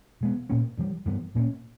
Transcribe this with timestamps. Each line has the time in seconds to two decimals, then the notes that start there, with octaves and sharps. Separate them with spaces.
0.21 B2 G#3 B3
0.50 A#2 A#3 C#4
0.78 G2 E3 G3
1.05 G2 E3 G3 B3
1.35 A#2 A#3 C#4